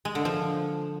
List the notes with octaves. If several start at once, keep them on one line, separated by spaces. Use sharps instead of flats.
G#3
D3
F3